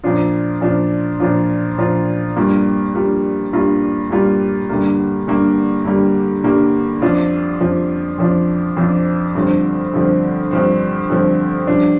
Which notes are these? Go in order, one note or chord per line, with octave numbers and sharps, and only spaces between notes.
A#2 F3 D4 F4
A#2 F3 D4 F4
A#2 F3 D4 F4
A#2 F3 D4 F4
G2 G3 A#3 F4
G2 G3 A#3 F4
G2 G3 A#3 F4
G2 G3 A#3 F4
G2 D3 G3 A#3
G2 D3 G3 A#3
G2 D3 G3 A#3
G2 D3 G3 A#3
F2 F3 D4 F4
F2 F3 D4 F4
F2 F3 D4 F4
F2 F3 D4 F4
G2 D3 F3 C4
G2 D3 F3 C4
G2 D3 F3 C4
G2 D3 F3 C4
G2 F3 D4